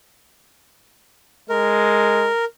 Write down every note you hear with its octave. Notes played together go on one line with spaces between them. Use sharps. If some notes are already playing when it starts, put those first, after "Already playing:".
G#3 A#4